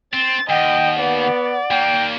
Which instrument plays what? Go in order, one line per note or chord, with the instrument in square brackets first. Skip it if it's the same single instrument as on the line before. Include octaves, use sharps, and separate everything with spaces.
[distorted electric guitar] C4 [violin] A6
[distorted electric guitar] D#2 [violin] D#5 [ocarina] F#5 [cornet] G5
[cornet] B3 [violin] D5
[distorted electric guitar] D#2 A#3 [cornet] G5